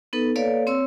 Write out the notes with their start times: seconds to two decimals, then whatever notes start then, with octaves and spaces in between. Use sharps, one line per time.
0.13 B3 D#4 A4 B4
0.36 A#3 A4 B4 C#5 D5 F5
0.67 C4 C#5 C6 E6